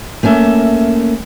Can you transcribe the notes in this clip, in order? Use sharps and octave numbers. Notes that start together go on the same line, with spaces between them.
A3 A#3 C#4 E5